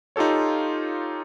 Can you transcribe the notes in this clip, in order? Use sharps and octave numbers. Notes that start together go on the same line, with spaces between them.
D#4 F4 G4 A4 C#5